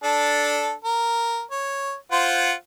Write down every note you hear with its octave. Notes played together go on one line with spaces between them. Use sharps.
D4 A4
A#4
C#5
F4 C5 F#5